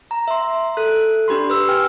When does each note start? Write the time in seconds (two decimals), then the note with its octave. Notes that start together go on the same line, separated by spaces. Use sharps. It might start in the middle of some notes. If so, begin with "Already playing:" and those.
0.11 A#5
0.28 E5 C6
0.77 A4 F#6
1.28 D4 G4 B5 C6
1.50 B4 E6
1.69 G5 G#5 F6